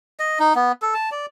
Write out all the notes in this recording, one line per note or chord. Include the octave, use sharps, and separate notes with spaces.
D#5
D#4
B3
A4
A5
D5